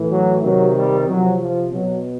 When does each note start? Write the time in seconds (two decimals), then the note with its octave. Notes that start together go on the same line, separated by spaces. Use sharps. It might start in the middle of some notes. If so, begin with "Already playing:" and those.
Already playing: A2 E3
0.11 F#3
0.43 C3 D#3 F#3
0.75 G3
1.09 C3 F3 F#3
1.41 F3
1.73 B2 F#3